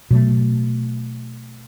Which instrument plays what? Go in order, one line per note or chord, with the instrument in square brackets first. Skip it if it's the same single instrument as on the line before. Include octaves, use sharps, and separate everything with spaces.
[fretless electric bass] B2 F#3 A3